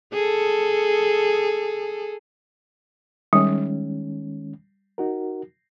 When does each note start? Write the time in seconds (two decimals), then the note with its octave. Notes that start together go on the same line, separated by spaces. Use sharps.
0.14 G#4 A4
3.33 D#3 G3 G#3 C#4
4.98 D#4 F#4 A#4